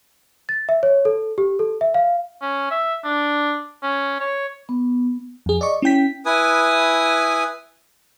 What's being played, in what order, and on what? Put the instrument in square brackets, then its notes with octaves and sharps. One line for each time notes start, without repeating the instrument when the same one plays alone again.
[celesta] A6
E5
C#5
A4
G4
A4
E5
F5
[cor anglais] C#4
E5
D4
C#4
C#5
[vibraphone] B3
[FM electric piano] F2 G#4
D5 D#5 C#6
C#4 E4 G5 B6
[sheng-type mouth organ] E4 B4 G#5 D#6